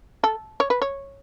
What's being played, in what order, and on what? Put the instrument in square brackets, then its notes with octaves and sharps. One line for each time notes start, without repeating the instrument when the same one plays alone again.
[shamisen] A4
C#5
B4
C#5